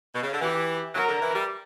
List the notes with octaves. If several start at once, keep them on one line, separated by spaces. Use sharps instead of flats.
B2
C#3
D3
E3 G4
F#3 A#4
D3
E3
G3